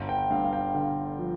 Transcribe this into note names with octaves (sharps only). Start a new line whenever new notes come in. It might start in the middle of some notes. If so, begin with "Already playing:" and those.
Already playing: G1
G5
G2 F5
F5
G5
D3 F5
F3